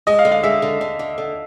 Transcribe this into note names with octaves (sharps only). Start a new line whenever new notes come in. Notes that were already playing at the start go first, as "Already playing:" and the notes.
G#3 D#5
F5
D3
F5
G#3 E5
D3
D3
D3
D3